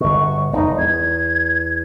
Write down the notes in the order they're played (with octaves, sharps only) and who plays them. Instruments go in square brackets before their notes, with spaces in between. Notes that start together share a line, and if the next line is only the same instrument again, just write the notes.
[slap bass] G1 B2 [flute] C#6
[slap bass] E1 [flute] D#4
[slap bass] E2 [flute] G#6